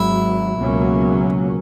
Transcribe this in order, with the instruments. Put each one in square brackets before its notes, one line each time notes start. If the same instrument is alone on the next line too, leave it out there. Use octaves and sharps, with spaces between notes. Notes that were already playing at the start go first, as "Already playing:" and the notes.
Already playing: [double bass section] G#1 G#2 F#3 [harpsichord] E4
[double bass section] C#2 B2 F#3 A#3 C#4